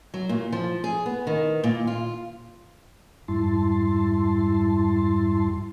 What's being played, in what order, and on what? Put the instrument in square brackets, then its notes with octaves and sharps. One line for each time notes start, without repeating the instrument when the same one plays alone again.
[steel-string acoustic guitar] F#3
A#2
F3
G#4
B3
D#3
A#2
F4
[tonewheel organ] F2 G#2 G3 E4 A5 C6